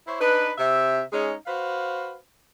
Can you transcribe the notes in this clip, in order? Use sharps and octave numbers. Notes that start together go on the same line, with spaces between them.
E4 C5 C#5 E5
D4 D#4 B4
C3 E5
G#3 C#4 D#4 G#4 C#5
F#4 B4 C5 F5